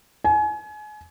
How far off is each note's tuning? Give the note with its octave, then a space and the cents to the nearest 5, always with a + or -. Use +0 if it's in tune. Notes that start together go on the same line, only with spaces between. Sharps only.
G#5 +30